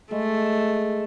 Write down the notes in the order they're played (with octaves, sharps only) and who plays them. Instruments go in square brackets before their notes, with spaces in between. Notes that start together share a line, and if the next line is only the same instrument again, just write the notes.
[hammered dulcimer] G#3 [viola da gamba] A3